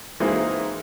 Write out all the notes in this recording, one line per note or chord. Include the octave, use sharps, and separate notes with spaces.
E3 G#3 A#3 C4 D#4 E4